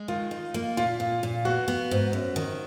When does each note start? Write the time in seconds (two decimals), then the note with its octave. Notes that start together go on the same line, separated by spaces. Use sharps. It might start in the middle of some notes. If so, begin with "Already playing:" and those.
Already playing: G#3
0.08 D#3 F4
0.31 D#4
0.54 A#3
0.77 A#2 F4
1.00 A#2
1.23 A#2
1.45 B3 F#4
1.68 B3
1.91 G#2
2.13 F#2
2.36 D#3